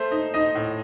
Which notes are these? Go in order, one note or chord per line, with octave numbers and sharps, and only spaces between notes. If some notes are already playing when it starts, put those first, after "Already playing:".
Already playing: A3 C5
D#4
D#4 D#5
A2